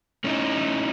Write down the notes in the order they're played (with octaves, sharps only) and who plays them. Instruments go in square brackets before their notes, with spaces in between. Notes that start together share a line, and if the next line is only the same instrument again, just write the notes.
[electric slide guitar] A3 C#4 D#4 E4